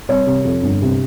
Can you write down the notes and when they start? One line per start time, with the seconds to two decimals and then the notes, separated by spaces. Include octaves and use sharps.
0.08 C2 C#5
0.27 C3
0.45 F2
0.62 G1
0.82 C3